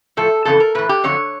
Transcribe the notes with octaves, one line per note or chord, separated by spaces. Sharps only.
A2 F3 A4
F2 C#3 E3 A4
A#4
A2 E3 B4
G4
F2 D3 F#3 C#5